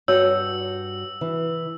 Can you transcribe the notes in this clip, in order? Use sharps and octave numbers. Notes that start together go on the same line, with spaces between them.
G2 F#4 C#5 E6
E3